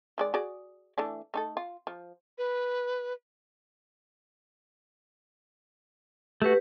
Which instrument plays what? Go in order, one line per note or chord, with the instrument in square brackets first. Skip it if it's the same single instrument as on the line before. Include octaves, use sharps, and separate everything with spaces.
[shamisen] D#3 G#3 D5
F#4 G#4 D5
E3 A3 D4
A3 D#4 A4
F4
F3
[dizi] B4
[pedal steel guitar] A3 F#4 [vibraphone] G4 B4